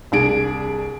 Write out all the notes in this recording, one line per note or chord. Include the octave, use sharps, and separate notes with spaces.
C2 D4 G#4 D7